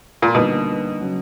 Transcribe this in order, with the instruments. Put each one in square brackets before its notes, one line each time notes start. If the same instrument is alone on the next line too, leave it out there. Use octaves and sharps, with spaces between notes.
[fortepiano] A#2
[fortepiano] B2 [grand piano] D3 G3 A#3 D#4
[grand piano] C#3 F#3